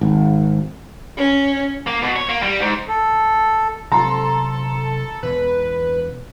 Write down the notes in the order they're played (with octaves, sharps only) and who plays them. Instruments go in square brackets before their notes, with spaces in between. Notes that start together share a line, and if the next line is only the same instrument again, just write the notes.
[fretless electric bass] G#1
[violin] C#4
[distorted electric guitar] A#3
B2
C#5
A#3
G3
G#2
[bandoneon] A4
[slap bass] C3 F#3 C4 [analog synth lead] A4 [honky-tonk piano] A#5 C6
[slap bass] E2 B2 [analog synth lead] B4